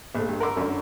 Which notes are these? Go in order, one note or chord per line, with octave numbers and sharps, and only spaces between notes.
A#1 A3
G2
A#4 F#5 B5 C6 D6 E6
F#2 D3